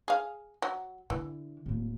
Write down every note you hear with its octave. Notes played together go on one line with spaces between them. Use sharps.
G#4 F5
F#3
D3 E3
D1 A#3